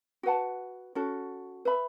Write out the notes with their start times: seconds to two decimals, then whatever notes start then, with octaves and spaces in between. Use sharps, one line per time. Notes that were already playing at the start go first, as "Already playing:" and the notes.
0.23 F#4 B4 F#5 A5
0.95 C#4 F#4 A4
1.65 B4 E5 B5